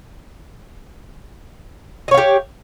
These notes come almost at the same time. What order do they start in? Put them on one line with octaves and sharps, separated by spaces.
D#5 C#5 F5 G4